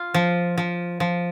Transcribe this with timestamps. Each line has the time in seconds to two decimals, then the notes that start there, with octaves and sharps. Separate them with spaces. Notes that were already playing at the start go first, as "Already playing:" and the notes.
Already playing: F4
0.14 F3
0.58 F3
1.00 F3